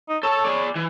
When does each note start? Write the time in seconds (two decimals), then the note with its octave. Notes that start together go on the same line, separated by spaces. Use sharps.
0.09 D#4
0.23 A4 C#5 A5
0.44 G#4 D5
0.76 E3